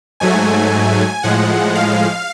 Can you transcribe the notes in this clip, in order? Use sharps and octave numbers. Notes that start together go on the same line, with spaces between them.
G#2 F#3 A3 G#5
A2 F3 G#3 F#5
F5